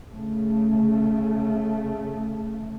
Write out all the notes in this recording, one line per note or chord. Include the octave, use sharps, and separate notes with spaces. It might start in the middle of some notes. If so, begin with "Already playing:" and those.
C#3 A3